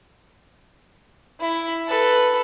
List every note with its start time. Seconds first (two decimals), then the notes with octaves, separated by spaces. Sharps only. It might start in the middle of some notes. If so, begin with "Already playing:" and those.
1.40 E4
1.89 A4 B4